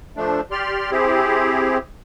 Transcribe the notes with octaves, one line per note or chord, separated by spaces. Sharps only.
F3 A3 D4
G4 D5 C6 F6
C4 E4 G4 G#4